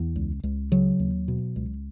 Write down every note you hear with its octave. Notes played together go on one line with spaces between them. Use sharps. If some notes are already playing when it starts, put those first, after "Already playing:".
Already playing: E2
C#2
C#2
C#3 F#3
D#2
B2
C#2